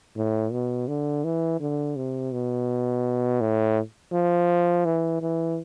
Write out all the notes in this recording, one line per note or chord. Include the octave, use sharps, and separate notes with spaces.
A2
B2
D3
E3
D3
C3
B2
A2
F3
E3
E3